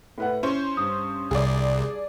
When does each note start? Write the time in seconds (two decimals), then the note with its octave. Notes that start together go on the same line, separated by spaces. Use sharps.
0.18 A2 B4 F#5
0.43 C#4 E4 C5
0.77 G2 D#6
1.31 C2 G#4 D5